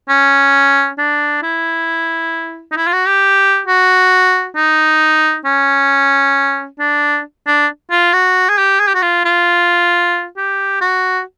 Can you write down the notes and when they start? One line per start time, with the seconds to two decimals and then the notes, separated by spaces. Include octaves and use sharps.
0.09 C#4
0.99 D4
1.43 E4
2.71 D#4
2.77 E4
2.87 F4
2.93 F#4
3.07 G4
3.66 F#4
4.56 D#4
5.45 C#4
6.79 D4
7.47 D4
7.91 F4
8.13 F#4
8.49 G#4
8.58 G4
8.80 G#4
8.88 G4
8.95 F#4
9.02 F4
9.25 F4
10.37 G4
10.81 F#4